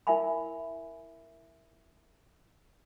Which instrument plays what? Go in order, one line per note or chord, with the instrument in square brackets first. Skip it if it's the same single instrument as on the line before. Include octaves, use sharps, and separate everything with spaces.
[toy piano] E4 A#4 E5 G#5 B5